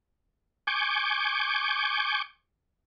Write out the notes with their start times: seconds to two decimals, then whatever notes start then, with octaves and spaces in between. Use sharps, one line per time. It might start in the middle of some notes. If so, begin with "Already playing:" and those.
0.67 G#5 C#6 D6 G6